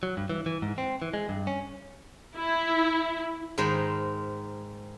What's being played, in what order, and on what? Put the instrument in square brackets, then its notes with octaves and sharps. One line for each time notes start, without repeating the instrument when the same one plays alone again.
[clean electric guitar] F#3
G2
E3
E3
G#2
C4
E3
G#3
G2
C#4
[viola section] E4
[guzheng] G#2 D#3 G#3 A#4 C5 B5